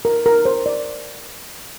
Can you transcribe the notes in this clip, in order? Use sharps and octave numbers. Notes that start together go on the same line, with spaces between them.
A#4
A#4
C5
D5